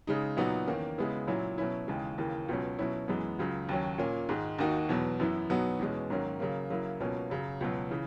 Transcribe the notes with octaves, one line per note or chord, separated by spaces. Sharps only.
C#3 G#3 D#4
A#2 F#3 B3 D#4 F#4
E2 D#3 A#3 C#4
C#3 G#3 B3 E4
A#2 F#3 C#4 E4
B2 F#3 C#4 E4
D#2 C#3 E3 G#3
D#2 C#3 E3 A#3
C#2 B2 F#3 C#4
B2 F#3 C#4 E4
F#2 E3 G#3 B3
C#2 C#3 F#3
D#2 D#3 F#3 C#4
A#2 A#3 C#4
G#2 D#3 G#3
D#2 D#3 A#3 D#4 F#4
E2 B2 F#3
F#2 E3 B3 E4
B2 F#3 B3 D#4 F#4
E2 B2 G#3 C#4
G#2 D#3 F#3 A#3 C#4
C#3 F#3 A#3
C#3 F#3 A#3 E4
C#2 B2 F#3 A#3 C#4
F#2 C#3 F#3
C#2 B2 F#3
C#3 E3